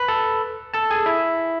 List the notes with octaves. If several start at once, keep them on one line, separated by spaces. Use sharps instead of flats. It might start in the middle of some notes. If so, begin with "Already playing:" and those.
Already playing: B4 B5
A4 A5
A4 A5
G#4 G#5
E4 E5